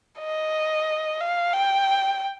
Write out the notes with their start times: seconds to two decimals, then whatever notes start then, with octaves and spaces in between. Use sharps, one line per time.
0.20 D#5
1.21 F5
1.54 G5